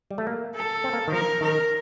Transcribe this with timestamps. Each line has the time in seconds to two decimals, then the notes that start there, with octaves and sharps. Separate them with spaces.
0.11 G3
0.18 A3
0.27 A#3
0.55 A4
0.84 C4
0.93 A#3
1.08 D#3
1.12 F3 A#4
1.41 D#3 A#4